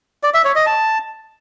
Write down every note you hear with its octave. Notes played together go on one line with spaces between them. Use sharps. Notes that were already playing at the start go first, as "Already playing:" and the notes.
D5
E5
C#5
D#5
A5